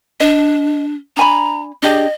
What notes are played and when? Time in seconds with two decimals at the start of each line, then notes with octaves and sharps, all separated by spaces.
0.20 D4 D#5
1.17 D4 G#5 A#5 B5
1.83 D4 G4 G#4 D#5